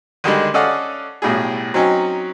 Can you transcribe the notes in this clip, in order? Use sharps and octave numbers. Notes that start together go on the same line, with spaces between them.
D3 D#3 G3 G#3
C#4 A4 D5 D#5 F5 F#5
B1 A2 G3 G#4
F#3 C4 C#4 D#4